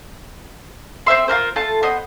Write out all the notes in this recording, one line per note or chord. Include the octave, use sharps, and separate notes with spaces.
C4 C5 E5 C6
F4 F#4 A#4 C5
A3 F4 A5
B3 C5 D#5